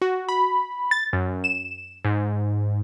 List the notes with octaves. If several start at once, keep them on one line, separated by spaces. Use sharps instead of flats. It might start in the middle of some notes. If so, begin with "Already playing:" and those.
F#4
B5
A6
F#2
E7
G#2